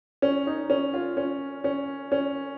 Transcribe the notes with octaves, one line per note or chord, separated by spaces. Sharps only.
C#4
D#4
C#4
F4
C#4
C#4
C#4